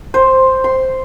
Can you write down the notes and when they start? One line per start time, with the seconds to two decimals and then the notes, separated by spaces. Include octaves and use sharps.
0.14 C5
0.64 C6